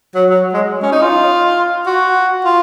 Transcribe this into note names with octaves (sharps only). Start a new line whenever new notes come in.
F#3
F#3
G#3
C#4
D#4
F4
F#4
F4